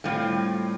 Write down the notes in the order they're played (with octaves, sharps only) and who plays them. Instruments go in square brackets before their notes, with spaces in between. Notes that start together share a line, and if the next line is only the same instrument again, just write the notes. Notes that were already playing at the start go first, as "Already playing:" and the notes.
[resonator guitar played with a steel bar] A2 G3 C4 F4